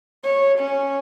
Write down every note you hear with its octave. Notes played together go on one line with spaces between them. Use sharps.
C#5
C#4